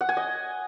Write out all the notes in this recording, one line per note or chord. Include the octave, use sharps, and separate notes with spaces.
F#5
G#5
D#5